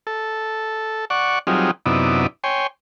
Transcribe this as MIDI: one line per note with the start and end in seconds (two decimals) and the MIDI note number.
0.07 1.05 69
1.10 1.39 74
1.10 1.39 78
1.10 1.39 85
1.47 1.71 54
1.47 1.71 55
1.47 1.71 60
1.47 1.71 63
1.47 1.71 65
1.47 1.71 68
1.86 2.27 42
1.86 2.27 48
1.86 2.27 59
1.86 2.27 63
1.86 2.27 64
1.86 2.27 74
2.44 2.67 73
2.44 2.67 79
2.44 2.67 80
2.44 2.67 84